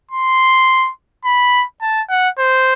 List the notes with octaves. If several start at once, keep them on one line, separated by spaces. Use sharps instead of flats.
C6
B5
A5
F#5
C5